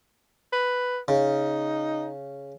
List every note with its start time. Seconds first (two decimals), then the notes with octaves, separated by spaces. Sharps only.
0.52 B4
1.08 C#3 D#4